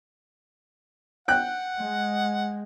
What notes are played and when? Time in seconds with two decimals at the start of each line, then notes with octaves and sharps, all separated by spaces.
1.28 F#5 G5 F#6
1.77 G#3